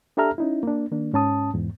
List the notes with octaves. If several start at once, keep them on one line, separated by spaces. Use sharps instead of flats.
D4 G4 A4 E5 A#5 F6
C#4 D#4 E4
A#3 D4
D#3 A#3 D4
G#2 C#4 A5 D#6
E2 G#2